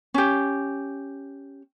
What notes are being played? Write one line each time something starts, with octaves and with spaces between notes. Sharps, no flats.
C#4 G4